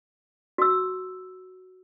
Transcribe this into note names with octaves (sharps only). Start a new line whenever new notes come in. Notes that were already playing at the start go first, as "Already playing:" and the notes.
F#4 E6